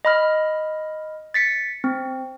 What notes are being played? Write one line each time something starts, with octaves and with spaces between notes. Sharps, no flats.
D#5 B5 F6
A6 B6 C#7
C4